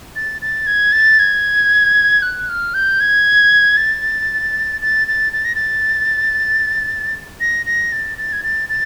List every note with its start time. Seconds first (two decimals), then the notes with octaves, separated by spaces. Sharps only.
0.16 A6
0.42 A6
0.67 G#6
0.92 A6
1.19 G#6
2.22 F#6
2.49 F6
2.74 G6
3.01 G#6
3.77 A6
4.82 A6
5.08 A6
5.33 A6
5.45 A#6
5.55 A6
7.40 A#6
7.66 A#6
7.92 A6
8.18 A6
8.33 G#6
8.44 A6
8.70 A6